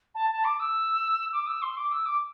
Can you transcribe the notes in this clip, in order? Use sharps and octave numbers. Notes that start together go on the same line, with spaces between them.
A5
A5
D6
E6
D6
E6
C6
D6
E6
D6